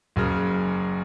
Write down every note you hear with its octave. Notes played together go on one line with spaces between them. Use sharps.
F#1 F#2 C#3